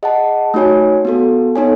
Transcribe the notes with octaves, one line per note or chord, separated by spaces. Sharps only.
G#4 D#5 F#5 A5
A3 D#4 F#4 C#5 G#5
B3 F#4 A4
B3 D#4 A4 C#5 G#5